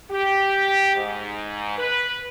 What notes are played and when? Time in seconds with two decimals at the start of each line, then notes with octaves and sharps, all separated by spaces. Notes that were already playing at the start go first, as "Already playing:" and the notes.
0.10 G4
0.95 G#2
1.78 B4